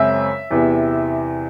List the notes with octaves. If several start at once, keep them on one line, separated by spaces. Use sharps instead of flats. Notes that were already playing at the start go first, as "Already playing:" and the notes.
Already playing: F#2 C#3 G#3 C4 E5
E2 C3 E3